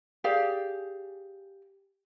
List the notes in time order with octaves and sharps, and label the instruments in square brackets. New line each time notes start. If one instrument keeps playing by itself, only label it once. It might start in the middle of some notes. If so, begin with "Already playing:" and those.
[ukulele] G4 G#4 D5 F5